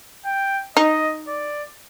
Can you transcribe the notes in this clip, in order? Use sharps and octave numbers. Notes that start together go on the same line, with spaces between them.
G5
D#4 D#5
D5